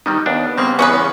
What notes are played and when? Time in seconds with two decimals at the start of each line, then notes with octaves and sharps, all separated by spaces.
0.06 D#3 G3 B3 D#4
0.26 D#2 B3 D4
0.58 C#3 G3 A#3 C4
0.79 E2 C#4 G#4 B4